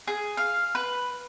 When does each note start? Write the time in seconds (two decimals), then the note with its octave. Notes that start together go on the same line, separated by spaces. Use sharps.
0.07 G#4
0.37 F5
0.75 B4